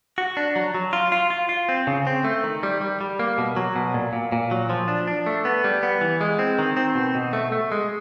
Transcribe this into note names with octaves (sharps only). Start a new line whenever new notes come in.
F#4
D4
F#3
F#3
F4
F4
F4
F4
C4
C#3
C4
A3
D#3
G3
G3
G3
A#3
B2
F#3
B2
A#2
A#2
A#2
F#3
F3
D4
D4
A3
B3
G3
B3
E3
G#3
C4
D#3
C4
B2
B2
A3
A3
G#3